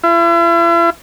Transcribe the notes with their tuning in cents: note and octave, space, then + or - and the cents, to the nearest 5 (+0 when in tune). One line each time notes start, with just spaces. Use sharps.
E4 +45